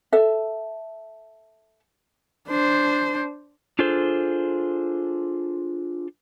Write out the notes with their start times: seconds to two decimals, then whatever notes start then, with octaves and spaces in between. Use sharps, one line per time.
0.12 A4 E5
2.48 D4 C5
3.79 D4 F4 G#4 A4 C5